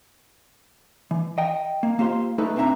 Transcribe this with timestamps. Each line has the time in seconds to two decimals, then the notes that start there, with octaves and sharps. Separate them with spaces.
1.11 E3
1.38 D#5 G5
1.83 A#3
1.99 A#3 F4 G4 C5 C6
2.38 A3 D#4 A4 B4
2.56 B1 C4 D4 E5 A#5